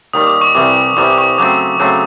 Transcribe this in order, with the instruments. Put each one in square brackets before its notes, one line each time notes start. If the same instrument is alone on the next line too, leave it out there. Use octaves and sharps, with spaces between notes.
[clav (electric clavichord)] D#2 D#3 G3 [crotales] D#6
[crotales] D6
C#6
[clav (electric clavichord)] C2 C3 E3 G3 [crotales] D6
[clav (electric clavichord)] C2 C3 E3 G3 [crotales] D6
[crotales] C#6
[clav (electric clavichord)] C#3 F#3 A3 C4 [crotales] D6
[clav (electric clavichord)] C#3 F#3 A3 C4